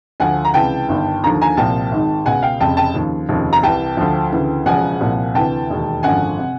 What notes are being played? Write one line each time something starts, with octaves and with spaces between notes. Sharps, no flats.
D2 D3 F3 F#5 G#5
A#5
C#2 C3 E3 G5 A5
G1 G2 D#3
D#2 D3 F3 A#5
G#5 A#5
C2 A#2 F3 G5 A5
G#1 G#2 D#3
C#2 B2 F#5 G#5
F5 G5
F1 F2 C#3 G5 A5
G5 A5
D#2 C#3 F3
F1 D#2 C#3 F3
A#5
C2 C3 E3 G5 A5
D2 D3 F3
D2 C#3 E3
E1 E2 C#3 F3 F#5 G#5
C2 A#2 F3
D2 C3 E3 G5 A5
E1 D#2 D#3
G#1 F#2 D3 F3 F#5 G#5
C3